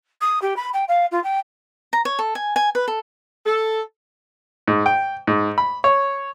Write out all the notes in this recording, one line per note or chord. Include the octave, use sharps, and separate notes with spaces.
D#6
G4
B5
G5
F5
F4
G5
A#5
C#5
A4
G#5
G#5
B4
A4
A4
G#2
G5
G#2
B5
C#5